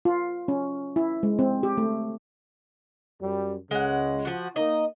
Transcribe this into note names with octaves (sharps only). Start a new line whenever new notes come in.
F4
C#4
E4
G#3
C4
G4
A3
F#2 G3
C#2 C#3 G#3 F#5
F3 F#4
A#3 D#4 D#5